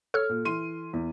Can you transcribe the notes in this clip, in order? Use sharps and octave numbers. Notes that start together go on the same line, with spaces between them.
A4 C#5 F6
A#2
E3 C6 D#7
E2